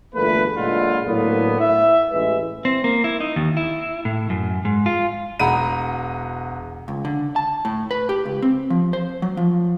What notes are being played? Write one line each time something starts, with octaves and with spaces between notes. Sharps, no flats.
G1 E2 A3 A#3 B4
A#2 D3 F#3 G#3 E4 F4
A2 D3 F#3 A#3 B3
E5
A1 G#3 B4 E5
C4
A#3
E4
D#4
D#2
E4
A2
F#2
G#2
F4
E1 F#5 A#5 B5 D#7
C#2
D3
A5
A2
B4
G4
C#2
C4
F3
C5
F#3
F3